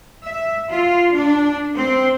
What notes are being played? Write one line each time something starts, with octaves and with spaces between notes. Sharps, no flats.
E5
F4
D4
C4